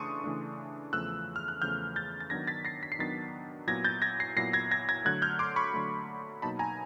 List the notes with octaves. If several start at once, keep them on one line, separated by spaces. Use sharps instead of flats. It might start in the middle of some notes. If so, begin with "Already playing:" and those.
Already playing: C#3 E3 A3 D4 C6 C#6 D#6
C#3 E3 A3 D4
E2 C#3 F3 A3 E6 F#6
F6
F#6
E2 C#3 F3 A3 F6 G6
G6 A6
A6
D#3 F#3 B3 D4 G#6 A#6
A6 B6
A#6 C7
B6
C7
D#3 F#3 B3 D4 A6 B6
A#2 F#3 B3 E4 G#6 A#6
G6 A6
G#6 A#6
A#6 C7
A#2 F#3 B3 E4 A#6 C7
G#6 A#6
G#6 A#6
G#6 A#6
D3 F#3 A3 F#6 G#6
F6 G6
C6 D6
B5 C#6
D3 F#3 A3
B2 F#3 A#3 D#4 A5 B5
G#5 A#5